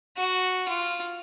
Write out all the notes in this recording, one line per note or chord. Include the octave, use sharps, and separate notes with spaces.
F#4
F4